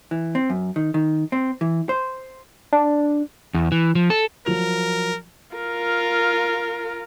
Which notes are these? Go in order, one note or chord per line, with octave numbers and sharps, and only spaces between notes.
E3
C4
F#2
D#3
D#3
C4
E3
C5
D4
E2
E3
F3
A4
F3 F#3 A#4 F7
F4 A#4